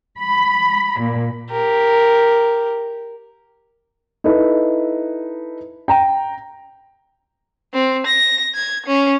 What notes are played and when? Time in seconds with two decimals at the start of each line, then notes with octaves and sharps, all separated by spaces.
0.17 B5
0.99 A#2
1.51 G4 A#4
4.24 D#4 E4 A4 B4
5.88 G5 A#5
7.74 C4
8.07 A#6
8.55 G#6
8.86 C#4